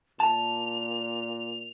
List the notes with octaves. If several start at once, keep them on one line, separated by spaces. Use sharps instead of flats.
A#2 A5 F7